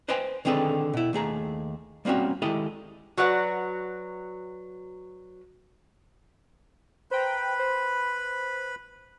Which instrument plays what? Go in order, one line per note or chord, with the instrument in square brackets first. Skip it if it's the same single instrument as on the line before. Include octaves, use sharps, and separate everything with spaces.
[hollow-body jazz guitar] B4 C5 D#5 G5 G#5 C6
D3 D#3 C4 G#4 A4 B4
B2 E4
D#2 A3 G#4 A#5
G3 A#3 C4 C#4 F#4
D#3 G#3 E4 G4 A4 D#5
[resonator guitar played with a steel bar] F#3 F#4 B4 D5 F#5
[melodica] B4 B5 [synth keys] C5 G5 A#5
[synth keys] C5